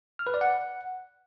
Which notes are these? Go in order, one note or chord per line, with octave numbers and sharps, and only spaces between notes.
F6
B4
D5
F#5